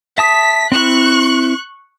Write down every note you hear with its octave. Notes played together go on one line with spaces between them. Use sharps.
E5 A5 D#6 B6
C4 E4 C#6 F#6